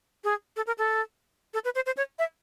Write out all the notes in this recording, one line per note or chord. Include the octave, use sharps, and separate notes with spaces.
G#4
A4
A#4
A4
A4
B4
C5
C5
C#5
E5